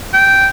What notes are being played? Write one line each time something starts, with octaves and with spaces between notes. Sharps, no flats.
G5